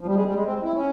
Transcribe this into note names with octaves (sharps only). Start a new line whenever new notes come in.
F3
G3
G#3
G3
G#3
C4
E4
C#4